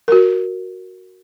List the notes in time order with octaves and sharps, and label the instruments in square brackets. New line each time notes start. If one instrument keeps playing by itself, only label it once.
[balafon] F#4 A#4